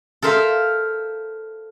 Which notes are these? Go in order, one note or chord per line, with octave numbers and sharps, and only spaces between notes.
A4 A#4 C5 E5 F5